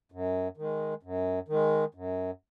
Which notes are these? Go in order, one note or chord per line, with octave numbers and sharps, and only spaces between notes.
F#2
D#3 G#3
F#2
D#3 G#3
F#2